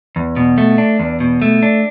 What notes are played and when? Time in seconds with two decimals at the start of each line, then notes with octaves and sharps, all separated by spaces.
0.16 E2
0.37 B2
0.58 A3
0.78 D4
1.00 E2
1.20 B2
1.42 A3
1.63 D4